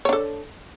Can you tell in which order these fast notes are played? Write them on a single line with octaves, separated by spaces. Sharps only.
C#5 D4 A4